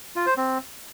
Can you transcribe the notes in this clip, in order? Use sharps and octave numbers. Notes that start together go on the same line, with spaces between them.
F4
C5
C4